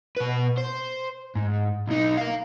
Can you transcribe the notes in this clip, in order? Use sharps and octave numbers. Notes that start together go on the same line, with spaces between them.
B2 B4
C5
G#2
B1 D#4
A#4 F5